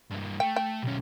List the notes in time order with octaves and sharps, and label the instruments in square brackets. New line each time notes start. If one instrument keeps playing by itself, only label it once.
[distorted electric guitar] G2 A#3
[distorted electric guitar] A3 [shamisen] G5
[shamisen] G5
[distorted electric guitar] B1 C#4